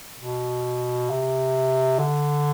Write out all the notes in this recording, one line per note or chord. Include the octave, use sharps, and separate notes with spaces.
B2
C3
D3